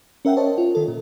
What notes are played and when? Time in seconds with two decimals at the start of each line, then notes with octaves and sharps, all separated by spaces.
0.25 C#4 A#4 E5 F#5 G5
0.37 A#4 C5 C#5 D#5 A5
0.58 F4
0.75 D#3 A4
0.88 A#2